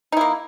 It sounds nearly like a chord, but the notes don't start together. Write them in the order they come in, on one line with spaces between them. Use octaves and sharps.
D#4 E4 A#3